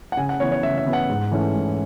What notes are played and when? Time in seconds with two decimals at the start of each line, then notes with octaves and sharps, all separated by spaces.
0.12 F#5
0.17 C#3 G#5
0.29 F#5
0.40 E3 B3 C#5
0.52 C#5
0.63 C#3 E5
0.78 E5
0.86 E3 B3
0.93 F#5
1.09 G#2
1.31 E3 A3 C#4
1.54 G#2